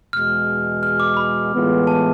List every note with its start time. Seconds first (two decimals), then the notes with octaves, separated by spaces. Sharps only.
0.13 E2 B2 G#3 F6
0.83 F6
1.00 D6
1.17 B5
1.52 A2 E3 G#3 B3 F4
1.87 A5